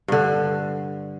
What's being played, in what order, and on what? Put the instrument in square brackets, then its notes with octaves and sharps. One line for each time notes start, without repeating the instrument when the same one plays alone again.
[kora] G2 D3